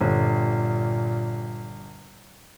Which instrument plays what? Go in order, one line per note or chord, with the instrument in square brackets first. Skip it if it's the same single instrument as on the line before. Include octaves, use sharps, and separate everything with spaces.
[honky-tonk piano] G1 [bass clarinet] A#2